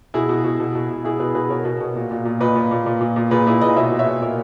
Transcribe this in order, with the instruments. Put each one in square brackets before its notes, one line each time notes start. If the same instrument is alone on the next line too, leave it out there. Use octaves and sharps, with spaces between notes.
[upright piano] B2 E4 G#4
B2
B2
B2
B2
B2
B2 E4 G#4
B2 G#4 B4
B2 G#4 B4
B2 A#4 C#5
B2
B2
A#2
A#2
A#2
A#2 B4 D#5
A#2
A#2
A#2
A#2
A#2
A#2 G#4 B4
A#2 E4 G#4
A#2 B4 D#5
B2 C#5 E5
B2
C#5 E5
B2
A#2 A#4 C#5